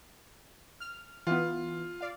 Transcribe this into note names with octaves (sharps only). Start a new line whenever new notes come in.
F6
E3 B3 F4
D5 F5